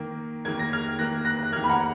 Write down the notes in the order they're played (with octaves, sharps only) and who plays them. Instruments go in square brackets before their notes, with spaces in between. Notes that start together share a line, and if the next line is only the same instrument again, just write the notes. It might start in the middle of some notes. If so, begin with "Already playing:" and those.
Already playing: [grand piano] D#3 A#3
D#3 A#3 G#6
A#6
F6 G#6
D#3 A#3 F#6 A#6
F#6 A#6
F#6
A#3 F6 G#6
D#3
B5
F#5 A#5